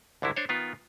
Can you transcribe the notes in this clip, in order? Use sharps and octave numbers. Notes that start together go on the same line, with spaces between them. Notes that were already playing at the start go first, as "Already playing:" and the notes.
C2 D3 F#3 E4
D4 C5 C#5
D#3 B3 F4